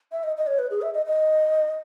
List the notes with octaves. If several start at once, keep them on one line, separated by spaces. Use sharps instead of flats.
E5
D#5
D#5
C#5
B4
G#4
E5
D#5
D#5